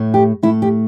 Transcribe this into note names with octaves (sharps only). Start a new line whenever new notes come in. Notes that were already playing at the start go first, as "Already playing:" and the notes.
Already playing: A2 A3
G4
A2 A3 E4
G4